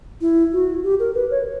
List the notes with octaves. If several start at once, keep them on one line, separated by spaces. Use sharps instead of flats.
E4
F#4
G4
A#4
B4
C#5